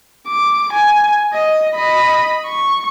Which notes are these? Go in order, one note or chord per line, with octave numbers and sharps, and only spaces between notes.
D6
G#5
D#5
D#5 B5
C#6